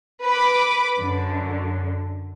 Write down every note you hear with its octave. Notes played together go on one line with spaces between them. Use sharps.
B4 B5 D6
F#2 D3